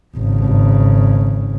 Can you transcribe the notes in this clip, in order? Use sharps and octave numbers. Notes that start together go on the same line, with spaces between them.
G#1 C#3